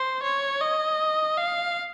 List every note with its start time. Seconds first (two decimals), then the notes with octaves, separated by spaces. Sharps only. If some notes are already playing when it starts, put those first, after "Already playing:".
Already playing: C5
0.23 C#5
0.62 D#5
1.37 F5